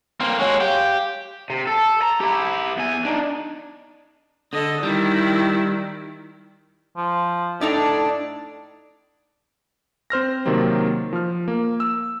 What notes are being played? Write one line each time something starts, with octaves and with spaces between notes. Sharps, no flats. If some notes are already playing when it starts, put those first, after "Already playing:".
A#3 C4
G#3 F#4 C#5
G4 F5
C3
A4
A#5
E4 G4
E2 G#5
D4 D#4
D3 A4 D#5
D#3 G3 E4
F3
A2 D4 D#4 A4 D5
C4 C5 F6 A#6
C3 D#3 F#3 A#3 C4
F3 F6
A#3
E6